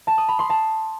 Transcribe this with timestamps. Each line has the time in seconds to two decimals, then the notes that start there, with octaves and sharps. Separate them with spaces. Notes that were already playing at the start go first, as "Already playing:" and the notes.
0.07 A5
0.18 D#6
0.28 B5
0.39 C6
0.50 A5